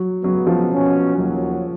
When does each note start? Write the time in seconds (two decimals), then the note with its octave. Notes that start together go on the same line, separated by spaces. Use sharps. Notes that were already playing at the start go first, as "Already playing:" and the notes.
Already playing: F#3
0.24 C#3 F#3 G#3 B3
0.47 F3
0.71 B2 F#3 C#4 F#4
1.17 D#2 C#3 F#3